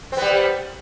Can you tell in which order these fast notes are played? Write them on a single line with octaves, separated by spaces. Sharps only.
C4 B3 G3